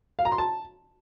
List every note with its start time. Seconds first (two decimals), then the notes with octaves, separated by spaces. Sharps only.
0.19 F5
0.25 A#5
0.32 C6
0.38 A5